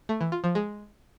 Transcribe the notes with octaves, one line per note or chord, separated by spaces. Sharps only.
A3
E3
F4
F3
G#3